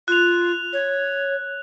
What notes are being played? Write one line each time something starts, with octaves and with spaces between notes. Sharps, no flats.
F4 F#6 F7
C#5